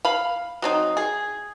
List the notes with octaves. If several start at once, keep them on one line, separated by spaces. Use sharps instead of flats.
F5 B5
F#3 C4 D#4
G#4